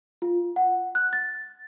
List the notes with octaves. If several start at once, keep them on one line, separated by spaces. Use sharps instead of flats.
F4
F#5
F#6
A6